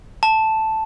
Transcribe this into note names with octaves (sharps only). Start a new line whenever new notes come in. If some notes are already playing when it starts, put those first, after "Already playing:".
A5